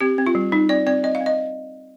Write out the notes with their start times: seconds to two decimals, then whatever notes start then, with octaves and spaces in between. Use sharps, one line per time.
0.01 C4 G4
0.18 C4
0.26 F4
0.35 G3
0.52 G3 D#4
0.69 C4 D5
0.86 C4 D5
1.03 C4 D#5
1.15 F5
1.21 C4
1.26 D#5